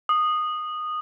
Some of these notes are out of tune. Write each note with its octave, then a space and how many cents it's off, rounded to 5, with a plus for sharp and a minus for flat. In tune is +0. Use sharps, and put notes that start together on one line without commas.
D#6 -15